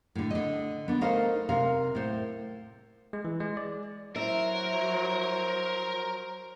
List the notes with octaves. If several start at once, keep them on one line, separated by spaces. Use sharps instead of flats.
A2 D3
D3 D#5
B3 D4
A3 D#4 A#4 C5 D#5 F5
C3 A#4 F5
A2 C5
G#3
E3
G#3
D5
F#3 E4 A#4 C5 E5